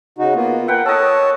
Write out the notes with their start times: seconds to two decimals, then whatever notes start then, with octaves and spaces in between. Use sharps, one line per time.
0.18 C#3 D#4 F#4
0.35 A#3 B3 F4
0.68 A#4 B4 F#5 G5
0.86 A4 C#5 D#5 A5